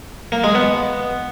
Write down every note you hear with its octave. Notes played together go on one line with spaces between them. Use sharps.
A#3
G#3
B3